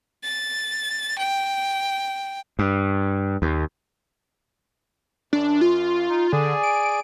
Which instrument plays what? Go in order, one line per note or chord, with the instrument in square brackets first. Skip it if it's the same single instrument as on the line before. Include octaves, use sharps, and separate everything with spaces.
[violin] A6
G5
[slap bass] G2
D#2
[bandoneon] F#2 [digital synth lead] D4
[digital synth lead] F4
[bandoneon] D#4
[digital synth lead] D3 [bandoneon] G#4 D5 G#5
[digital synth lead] D7